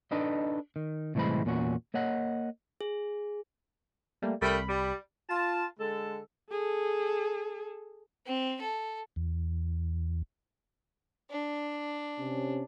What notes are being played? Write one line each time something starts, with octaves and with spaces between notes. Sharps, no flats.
D4 D#4 A4 B4 D#5
D#3
C2 A2 E3 G#3 C5 B5
E2 A#2 C#4 F#4
A#3 C#5 D#5 F#5
G#4
G3 A3 A#3
C2 G3 A3 A#4 B5
G3
F4 A5
D3 G#3 A4
G#4 A4
C4
A4
E2
D4
C3 C#4